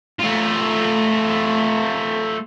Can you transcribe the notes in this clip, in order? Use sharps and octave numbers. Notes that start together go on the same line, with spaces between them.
A3 F4